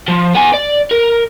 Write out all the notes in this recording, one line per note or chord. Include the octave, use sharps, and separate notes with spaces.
F3
B3 G#5
D5
A#4